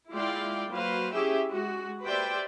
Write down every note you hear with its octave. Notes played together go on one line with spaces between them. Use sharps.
G#3 E4 F4 D5 F5 G5
F#3 A#3 B4 C5 F5
C#4 E4 G4 G#4 E5 G5
G#3 F#4
G4 B4 C5 D5 E5 G5